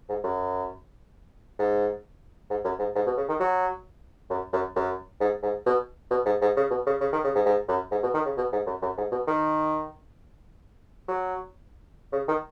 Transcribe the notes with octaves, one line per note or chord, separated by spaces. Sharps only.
G#2
F#2
G#2
G#2
F#2
G#2
G#2
B2
C#3
D#3
F#3
F#2
F#2
F#2
G#2
G#2
B2
B2
G#2
G#2
C#3
B2
C#3
C#3
D#3
C#3
G#2
G#2
F#2
G#2
B2
D#3
C#3
B2
G#2
F#2
F#2
G#2
B2
D#3
F#3
C#3
D#3